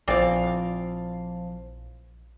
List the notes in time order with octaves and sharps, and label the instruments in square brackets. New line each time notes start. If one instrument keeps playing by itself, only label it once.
[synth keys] A#1 [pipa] E3 C4 D5 [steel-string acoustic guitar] F3 F5